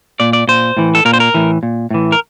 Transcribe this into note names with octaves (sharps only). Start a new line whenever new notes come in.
A#2 D5
D5
A#2 C5
A2 E3
A4
A#2 A#4
C5
A#4
A2 E3
A#2
A2 E3
A#4